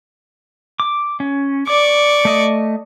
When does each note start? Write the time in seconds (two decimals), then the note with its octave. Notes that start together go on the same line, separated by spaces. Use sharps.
0.80 D6
1.20 C#4
1.67 D5 C#6 D6
2.25 A3 D#5